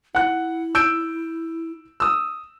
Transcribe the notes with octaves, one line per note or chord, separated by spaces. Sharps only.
E4 F#5 F#6
E6 G6 D7
D#6 E6